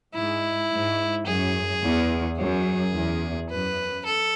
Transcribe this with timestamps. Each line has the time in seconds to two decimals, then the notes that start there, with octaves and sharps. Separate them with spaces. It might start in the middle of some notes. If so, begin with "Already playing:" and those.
0.15 G#2 E4
0.70 G#2
1.27 F#2 G#4
1.82 E2
2.38 F#2 G#4
2.93 E2
3.50 F#2 B4
4.06 A4